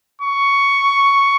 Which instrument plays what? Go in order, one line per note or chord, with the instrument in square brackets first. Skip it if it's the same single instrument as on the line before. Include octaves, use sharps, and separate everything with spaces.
[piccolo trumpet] C#6